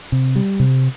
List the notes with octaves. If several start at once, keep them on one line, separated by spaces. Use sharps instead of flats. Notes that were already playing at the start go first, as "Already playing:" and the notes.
C3
G3
C3